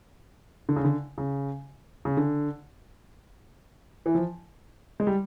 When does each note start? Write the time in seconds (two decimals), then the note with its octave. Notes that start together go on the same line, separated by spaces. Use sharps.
0.69 D3
0.76 C#3
0.84 D3
1.18 C#3
2.05 C#3
2.17 D3
4.06 E3
4.15 F3
5.00 G#3
5.07 G3